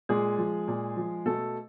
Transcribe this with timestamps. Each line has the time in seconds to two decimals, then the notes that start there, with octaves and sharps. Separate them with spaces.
0.09 A#2 G#3 G#4
0.38 F3
0.68 A#2
0.97 F3
1.26 B2 A3 A4